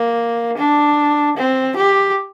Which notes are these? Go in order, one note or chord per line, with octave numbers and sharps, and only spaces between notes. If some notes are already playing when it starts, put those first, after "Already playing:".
Already playing: A#3
D4
C4
G4